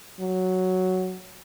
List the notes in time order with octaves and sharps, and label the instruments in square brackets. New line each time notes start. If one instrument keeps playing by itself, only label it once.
[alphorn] F#3